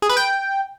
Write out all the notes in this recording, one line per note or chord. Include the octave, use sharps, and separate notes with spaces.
G#4
B4
G5